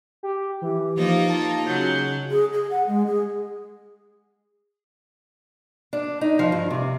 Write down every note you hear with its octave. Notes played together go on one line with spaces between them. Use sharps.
G4
E3 G4
F3 A#3 D#4 F4
A5
C#3 F#3 G6
G#4
G#4
F#5
G#3
G#4
D4
D#4
F3
G2
C3